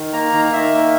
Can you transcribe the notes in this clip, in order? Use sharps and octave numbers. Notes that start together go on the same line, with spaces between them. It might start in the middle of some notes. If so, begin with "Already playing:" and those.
Already playing: D#3
A#3 A#5
D#3
D#3 E5
A#3